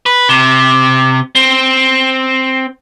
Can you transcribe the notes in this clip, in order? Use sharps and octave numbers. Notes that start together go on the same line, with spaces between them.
B4
C3
C4